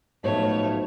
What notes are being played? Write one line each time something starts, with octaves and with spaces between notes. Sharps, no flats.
B1 A2 F3 A3 C#5